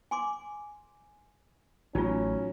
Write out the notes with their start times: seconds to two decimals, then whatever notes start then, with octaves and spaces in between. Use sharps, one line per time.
0.11 G#5 C6 D6
1.95 A1 F#3 C#4 D#4 F4